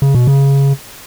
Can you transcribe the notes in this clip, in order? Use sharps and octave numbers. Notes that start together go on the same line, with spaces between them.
C#3
B2
C#3